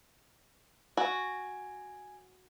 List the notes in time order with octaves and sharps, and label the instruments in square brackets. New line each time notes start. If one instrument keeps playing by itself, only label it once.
[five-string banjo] F#4 [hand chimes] G#5